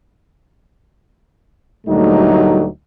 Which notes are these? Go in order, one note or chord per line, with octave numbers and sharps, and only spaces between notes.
D2 A#2 F#3 G3 A3 D#4